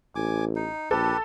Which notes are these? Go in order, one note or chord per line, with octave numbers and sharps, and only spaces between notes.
A1 G#5 D6
D#4
A#1 G4 A4 B4